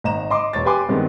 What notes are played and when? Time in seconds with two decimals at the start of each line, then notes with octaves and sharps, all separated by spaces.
0.04 G#1 D#5 A#5 E7
0.30 D#5 C6 D6
0.53 E1 C#5 A6
0.65 G4 B4 G5 G#5 C6 D6
0.89 G2 D#3 G#3 B3 C4